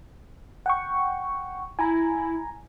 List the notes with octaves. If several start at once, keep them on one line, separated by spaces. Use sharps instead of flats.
F#5 G5 C#6
E4 G#5 A#5